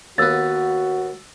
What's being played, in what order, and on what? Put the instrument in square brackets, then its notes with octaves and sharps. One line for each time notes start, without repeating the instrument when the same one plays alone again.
[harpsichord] D#2 B3 [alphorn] F#4 [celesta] E6 A6